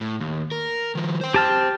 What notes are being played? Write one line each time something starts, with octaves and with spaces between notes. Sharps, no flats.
A2
D#2
A#4
D#3 F3
C5 G5
G4 A5 F6